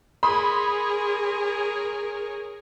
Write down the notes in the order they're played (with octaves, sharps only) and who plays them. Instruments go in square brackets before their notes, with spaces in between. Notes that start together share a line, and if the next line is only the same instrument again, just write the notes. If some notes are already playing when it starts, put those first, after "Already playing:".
[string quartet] G#4 A#4 C#5 [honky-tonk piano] B5 C6 D#6